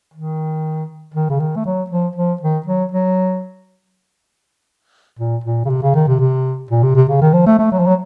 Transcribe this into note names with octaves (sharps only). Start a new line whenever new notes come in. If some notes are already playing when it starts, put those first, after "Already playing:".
D#3
D#3
C#3
D#3
A3
F#3
F3
F3
D#3
F#3
F#3
A#2
A#2
C#3
C3
C#3
D#3
C3
C3
A#2
C3
C3
C#3
D#3
F3
A3
A3
F#3
F3
F#3